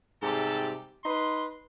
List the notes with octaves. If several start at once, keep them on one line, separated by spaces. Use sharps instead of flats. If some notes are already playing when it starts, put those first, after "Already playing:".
G#2 C3 G3 G4 A4
D#4 B4 C6